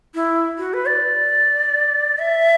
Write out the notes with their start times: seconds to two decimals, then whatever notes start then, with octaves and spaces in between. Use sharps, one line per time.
0.15 E4
0.58 F#4
0.74 B4
0.87 D5
2.19 E5